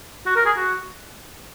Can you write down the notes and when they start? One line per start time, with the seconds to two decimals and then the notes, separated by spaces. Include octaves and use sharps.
0.26 F#4
0.36 A#4
0.46 G#4
0.57 F#4